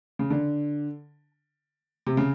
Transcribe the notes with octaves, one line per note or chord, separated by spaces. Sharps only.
C#3
D3
C3
C#3